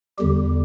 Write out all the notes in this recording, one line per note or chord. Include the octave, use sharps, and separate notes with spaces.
E2 D3 G3 G4